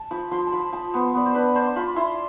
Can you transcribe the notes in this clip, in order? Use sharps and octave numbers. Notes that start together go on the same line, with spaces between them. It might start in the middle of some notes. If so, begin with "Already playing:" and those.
Already playing: A5
F3 B5
F3 C6
A5
F3 B5
F3 A5
B3 C5
B3 D5
C5
D4 B4
D4 C5
F4 B5
E4 C6